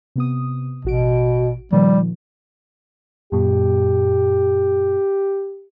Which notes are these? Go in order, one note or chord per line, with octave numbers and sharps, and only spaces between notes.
C3 B3 D#6
A1 B2 F#4 D7
A#2 D#3 F3 G3
F#2 A#2 G4